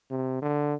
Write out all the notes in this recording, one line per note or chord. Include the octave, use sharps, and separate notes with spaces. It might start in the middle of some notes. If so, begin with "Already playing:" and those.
C3
D3